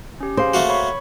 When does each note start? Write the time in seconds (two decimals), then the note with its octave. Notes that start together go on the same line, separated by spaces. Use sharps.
0.20 C#4 G4
0.37 G#4 C5 F5
0.54 A3 A#3 F#4
0.69 C#5 B5 C#6